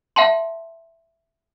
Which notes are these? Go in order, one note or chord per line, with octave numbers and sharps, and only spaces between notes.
E5 F#5 A5 C6